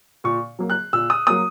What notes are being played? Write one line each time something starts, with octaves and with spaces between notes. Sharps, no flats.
A#2 C#6
F#3 A#3
F#6
A#2 E6
D#6
F#3 A#3 D#6